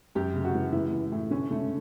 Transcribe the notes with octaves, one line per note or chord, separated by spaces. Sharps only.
F#2 G4
C#3
F#4
E3
E3 E4
E3
A2
D3 C#4
D3 A3